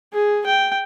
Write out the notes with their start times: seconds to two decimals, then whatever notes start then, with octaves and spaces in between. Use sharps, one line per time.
0.13 G#4
0.46 G5